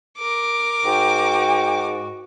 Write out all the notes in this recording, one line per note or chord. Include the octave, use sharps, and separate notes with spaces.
A#4 D6
G#2 F#4 G5